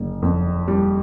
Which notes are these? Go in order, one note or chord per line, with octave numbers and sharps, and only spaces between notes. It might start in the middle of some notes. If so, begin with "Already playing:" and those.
Already playing: F#1 D3
F2
G3